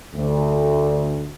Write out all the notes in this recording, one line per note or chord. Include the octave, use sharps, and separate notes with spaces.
D2